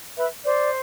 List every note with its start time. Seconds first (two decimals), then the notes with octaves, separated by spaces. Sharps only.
0.17 B4 E5
0.45 C5 D5